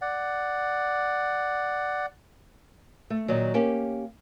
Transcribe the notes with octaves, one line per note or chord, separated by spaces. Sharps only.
D5 F#5
A3
A#2 D#3 F#3
A#3 C#4 G4